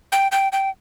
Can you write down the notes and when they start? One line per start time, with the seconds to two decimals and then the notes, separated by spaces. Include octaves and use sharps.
0.12 G5
0.32 G5
0.52 G5